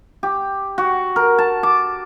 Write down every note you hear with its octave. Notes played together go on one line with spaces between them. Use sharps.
G4
F#4
A#4
A5
D6